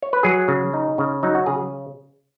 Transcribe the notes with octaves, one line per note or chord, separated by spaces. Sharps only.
C#5
B4
F#3 G#4
C#3
D#4
C#3
F#3 D#4
F#4
C#3 G#4